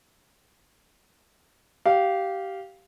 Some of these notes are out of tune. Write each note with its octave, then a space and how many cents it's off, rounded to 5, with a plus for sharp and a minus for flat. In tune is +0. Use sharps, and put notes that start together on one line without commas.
G4 -15 F5 +0